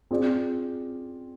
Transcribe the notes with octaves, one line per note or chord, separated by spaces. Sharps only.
C4 F4 G#4 D5